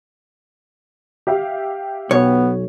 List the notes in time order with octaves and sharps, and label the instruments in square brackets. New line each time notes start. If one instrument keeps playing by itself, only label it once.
[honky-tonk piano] G4 E5 F5
[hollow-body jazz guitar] B1 C#5 [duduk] B3